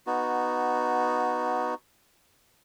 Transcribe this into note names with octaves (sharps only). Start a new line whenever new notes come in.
B3 D#4 F#4